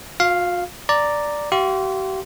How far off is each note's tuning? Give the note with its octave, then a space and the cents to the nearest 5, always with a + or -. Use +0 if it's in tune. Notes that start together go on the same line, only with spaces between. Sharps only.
F4 +45 F5 +0
D5 +0 A#5 -5
G4 -45 F5 -30 C6 +0